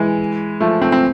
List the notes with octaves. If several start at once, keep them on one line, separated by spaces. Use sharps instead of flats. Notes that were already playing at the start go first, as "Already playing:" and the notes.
Already playing: E3 G#3
F3 A3
A3 C4
C4